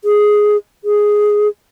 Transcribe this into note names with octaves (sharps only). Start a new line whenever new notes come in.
G#4
G#4